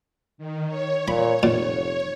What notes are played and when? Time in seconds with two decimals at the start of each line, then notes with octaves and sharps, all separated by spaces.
0.38 D#3
0.67 C#5
1.08 A#2 B5
1.43 F1 A#2